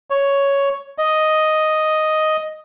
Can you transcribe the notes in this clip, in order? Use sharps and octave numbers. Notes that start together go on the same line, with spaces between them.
C#5
D#5